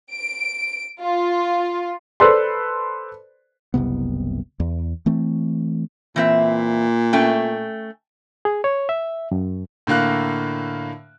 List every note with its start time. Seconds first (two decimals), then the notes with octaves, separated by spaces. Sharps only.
0.13 D7
1.03 F4
2.20 A4 B4 C5 D5 B5 C6
3.74 F#1 C2 C3 B3
4.60 E2
5.06 E3 A3 C4
6.16 A#2 E3 C4 E5
7.13 A3 C#4 G5
8.45 G#4
8.64 C#5
8.89 E5
9.31 F#2
9.87 A2 D3 A#3 F5 F#6